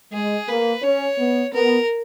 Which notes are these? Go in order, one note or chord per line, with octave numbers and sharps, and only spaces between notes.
G#3 G#4
A#3 B4
C#4 C#5
B3
B3 A#4